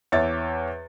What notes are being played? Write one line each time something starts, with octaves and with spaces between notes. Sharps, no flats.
E2 C#5 E5 D6 A6